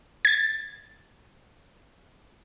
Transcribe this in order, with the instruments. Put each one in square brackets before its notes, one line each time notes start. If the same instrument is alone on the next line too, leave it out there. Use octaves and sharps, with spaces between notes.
[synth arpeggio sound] G#6 A6